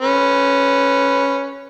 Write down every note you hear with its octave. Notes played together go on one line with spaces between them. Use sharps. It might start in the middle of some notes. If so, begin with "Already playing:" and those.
C#4 B4